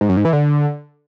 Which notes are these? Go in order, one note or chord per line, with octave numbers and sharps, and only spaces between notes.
G#2
F#2
G#2
E3
D3